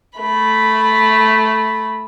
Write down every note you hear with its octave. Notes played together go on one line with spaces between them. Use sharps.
A3 B5